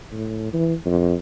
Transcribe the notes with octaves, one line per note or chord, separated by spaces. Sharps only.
A2
E3
F2